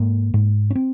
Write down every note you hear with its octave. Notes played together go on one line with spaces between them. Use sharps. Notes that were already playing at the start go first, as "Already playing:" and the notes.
Already playing: G#2 A#3
G#2
C#4
C4